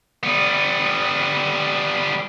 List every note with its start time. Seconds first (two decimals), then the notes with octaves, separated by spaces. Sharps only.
0.23 G3 B3